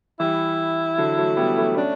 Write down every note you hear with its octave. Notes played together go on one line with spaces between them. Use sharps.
E3 G3 E4
D3 F#3
F#3 A3
G3 B3
F#3 A3
A3 C#4 D4